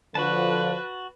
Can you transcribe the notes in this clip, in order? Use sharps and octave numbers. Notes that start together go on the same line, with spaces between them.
D3 F3 F#4 B4 A5